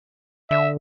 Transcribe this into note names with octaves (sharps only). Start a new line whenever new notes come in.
D3 E5